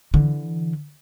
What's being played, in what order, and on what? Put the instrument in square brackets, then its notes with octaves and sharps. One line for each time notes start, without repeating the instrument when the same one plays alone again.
[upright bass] D3 E3